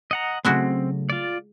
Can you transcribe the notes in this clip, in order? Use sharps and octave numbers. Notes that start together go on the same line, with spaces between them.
D#5 F#5 A#5
C#3 F#3 G#3 A3 C4 E4 F#4
F4 D5